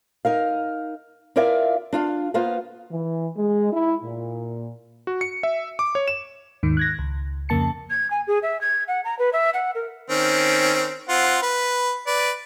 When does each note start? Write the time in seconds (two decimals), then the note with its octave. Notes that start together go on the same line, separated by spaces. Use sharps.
0.25 D#4 A#4 F5
1.36 E4 F4 A#4 D5 E5 F5
1.93 D4 F4 F5
2.34 A#3 B3 F4 C5 F5
2.91 E3
3.37 G#3
3.73 E4
4.04 A#2
5.07 F#4
5.21 C#7
5.43 E5
5.79 D6
5.95 C#5
6.08 E7
6.63 D#2 G#2 D#3
6.77 F#6 G#6 A#6
6.99 C#2
7.49 F2 C#3 A#3 A5 C#7
7.90 G#6
8.10 G#5
8.27 G#4
8.42 E5
8.61 G#6
8.88 F#5
9.04 A#5
9.19 B4
9.33 E5
9.54 F#5
9.75 A#4
10.10 D#3 C4 C#4
11.09 C4 F4 F#5
11.42 B4
12.07 B4 D5